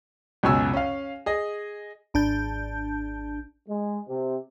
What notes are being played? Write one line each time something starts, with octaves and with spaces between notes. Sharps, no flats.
C#2 F#2 B2 C#5 G#5 E6
C#4 F5
G#4 D#5
G#1 D4 A5 G6
G#3
C3